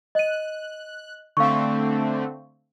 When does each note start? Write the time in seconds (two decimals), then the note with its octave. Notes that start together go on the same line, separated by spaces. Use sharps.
0.15 D#5 F#6 D#7
1.37 D3 A3 C4 F5 C#6